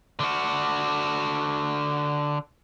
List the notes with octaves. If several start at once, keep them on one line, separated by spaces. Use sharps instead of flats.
D3 F#4